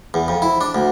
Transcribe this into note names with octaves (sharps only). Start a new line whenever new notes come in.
E2
F2
E4
D4
D2